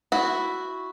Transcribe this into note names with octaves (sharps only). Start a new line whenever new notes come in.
E4 F#4